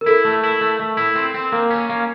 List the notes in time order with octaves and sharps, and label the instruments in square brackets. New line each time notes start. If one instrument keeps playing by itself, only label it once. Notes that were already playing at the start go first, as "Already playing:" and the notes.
[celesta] A#4
[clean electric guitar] E4 [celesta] A4
[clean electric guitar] A3
E4
A3
A3
E4
C4
C4
[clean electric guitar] A#3 [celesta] A#4
[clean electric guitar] C#4
A#3